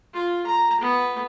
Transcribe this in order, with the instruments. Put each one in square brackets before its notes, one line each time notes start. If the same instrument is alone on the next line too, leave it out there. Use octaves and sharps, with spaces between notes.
[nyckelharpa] F4
A#5
B3